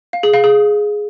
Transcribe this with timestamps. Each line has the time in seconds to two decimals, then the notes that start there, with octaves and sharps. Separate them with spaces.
0.13 F5
0.23 G#4
0.34 F5
0.44 G#4